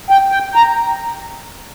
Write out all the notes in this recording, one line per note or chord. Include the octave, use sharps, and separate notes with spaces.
G5
G5
A#5